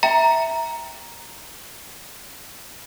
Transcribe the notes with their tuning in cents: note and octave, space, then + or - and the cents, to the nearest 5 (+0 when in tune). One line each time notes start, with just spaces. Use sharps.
E5 -10 G5 +0 A#5 +0